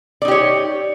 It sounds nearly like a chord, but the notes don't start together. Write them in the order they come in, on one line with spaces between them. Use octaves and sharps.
D5 D#4 G4 C#5